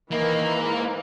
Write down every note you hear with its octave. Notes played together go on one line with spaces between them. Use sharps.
D#3 E3 A#3
G#2